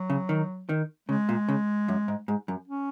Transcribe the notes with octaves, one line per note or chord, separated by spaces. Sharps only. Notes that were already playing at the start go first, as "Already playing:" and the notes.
Already playing: F#3
C#3
D#3
D#3
C#3 G#3
A#2
C#3
F#2
G#2
G#2
F#2
C#4